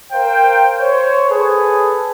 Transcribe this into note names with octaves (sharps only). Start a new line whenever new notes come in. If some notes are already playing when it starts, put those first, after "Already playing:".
A#4 C5 F5 G5
C5 C#5
G#4 A4 B4